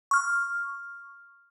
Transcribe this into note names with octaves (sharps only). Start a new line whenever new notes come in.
C#6 F6